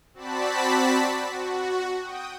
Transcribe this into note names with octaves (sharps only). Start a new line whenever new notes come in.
C4 F#4 D5 A5 B5 B6
F#4
G5 D#6